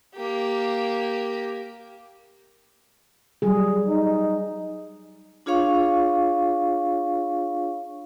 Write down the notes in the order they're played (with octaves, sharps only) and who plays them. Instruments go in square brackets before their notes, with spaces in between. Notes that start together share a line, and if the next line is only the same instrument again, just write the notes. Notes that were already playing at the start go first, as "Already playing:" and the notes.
[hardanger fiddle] A#3 G4
[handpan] F#3 G3 G#4
[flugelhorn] D#4
[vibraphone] D4 F4 G#4 C#5 F5 C#6